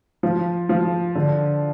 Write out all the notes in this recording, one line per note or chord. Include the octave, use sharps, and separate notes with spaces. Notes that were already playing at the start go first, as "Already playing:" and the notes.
F3
F3
D3